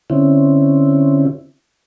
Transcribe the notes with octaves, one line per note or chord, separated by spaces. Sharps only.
D3 C4 C#4 E4